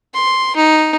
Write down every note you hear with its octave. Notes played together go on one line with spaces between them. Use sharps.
C6
D#4